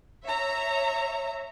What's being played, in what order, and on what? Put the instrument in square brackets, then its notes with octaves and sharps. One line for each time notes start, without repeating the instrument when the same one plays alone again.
[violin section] C#5 E5 A#5